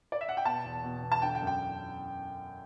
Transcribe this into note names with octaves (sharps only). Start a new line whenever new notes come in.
D5
E5
F#5
G5
B2 A5
E2
B2
E2
A5
D3 G5
G5
F#2
G5